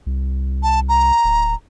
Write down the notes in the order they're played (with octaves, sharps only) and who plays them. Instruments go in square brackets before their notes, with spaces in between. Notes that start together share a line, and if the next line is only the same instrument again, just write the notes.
[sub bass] C2
[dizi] A5
A#5
[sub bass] D1